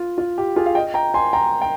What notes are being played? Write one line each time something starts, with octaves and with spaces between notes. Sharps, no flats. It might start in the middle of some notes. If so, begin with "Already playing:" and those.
Already playing: F4
F4
G4
F4 G#4
F5
D#5 G5
G5 A#5
G#5 C6
G5 A#5
G5